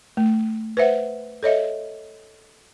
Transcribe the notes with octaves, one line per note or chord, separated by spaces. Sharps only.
A3
B4 C5 E5 F#5
A4 C#5 D#5 E5